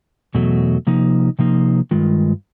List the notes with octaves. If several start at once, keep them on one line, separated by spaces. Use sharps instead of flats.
E2 B2 F#3 A3
C3 F3 A#3 D#4
C3 F3 A#3 D#4
G2 D#3 G#3 F4